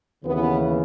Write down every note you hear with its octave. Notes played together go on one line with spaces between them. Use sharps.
D#2 C#3 E3 B3